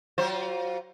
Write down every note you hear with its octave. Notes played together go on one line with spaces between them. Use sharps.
F#3 F4 C5